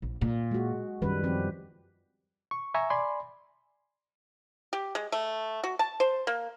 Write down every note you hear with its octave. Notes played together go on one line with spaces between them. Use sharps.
A#1
A#2
G#3 F#4
F#2 D#3 G3 C#4 B4
F3 C4 G4
C#6
E5 G#5 A#5 C#6
D5 G#5 B5 C6 D6
G4
G#3
A3
F#4
A5
C5
A#3